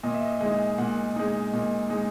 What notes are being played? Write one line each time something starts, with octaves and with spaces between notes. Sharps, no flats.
A#2 D#5
E5
D#5
G#3 D#4
A#2 F#5
G#3 D#4
A#2
G#3 D#4